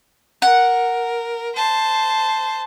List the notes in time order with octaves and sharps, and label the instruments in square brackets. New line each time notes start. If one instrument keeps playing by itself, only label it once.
[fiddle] A#4 [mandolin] F#5
[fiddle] C5 A5